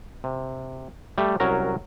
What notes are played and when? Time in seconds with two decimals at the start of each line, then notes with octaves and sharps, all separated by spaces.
0.24 C3
1.18 G3 A3
1.40 C2 F#3 C#4 A#4 A#5